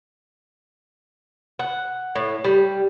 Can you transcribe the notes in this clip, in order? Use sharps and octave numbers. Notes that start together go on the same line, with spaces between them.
F#5
A2
G3